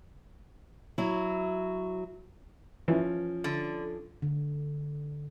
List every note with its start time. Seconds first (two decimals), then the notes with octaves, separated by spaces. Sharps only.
0.98 F#3 E4
2.88 E3 F3 C#4
3.44 D3
4.22 D3